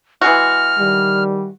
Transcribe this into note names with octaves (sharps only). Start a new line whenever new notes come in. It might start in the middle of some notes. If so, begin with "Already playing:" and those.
E3 G#3 F#4 F6
D#3 G3